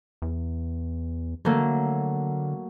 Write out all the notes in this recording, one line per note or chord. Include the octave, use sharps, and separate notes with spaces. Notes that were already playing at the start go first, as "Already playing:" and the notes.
E2
D3 F#3 A3 A#3